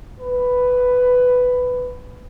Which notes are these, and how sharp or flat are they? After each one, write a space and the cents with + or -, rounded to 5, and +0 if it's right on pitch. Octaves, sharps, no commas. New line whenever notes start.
B4 +10